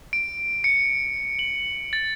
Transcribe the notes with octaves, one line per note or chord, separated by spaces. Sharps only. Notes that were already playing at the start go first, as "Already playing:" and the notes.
D7
C#7
F#7
A6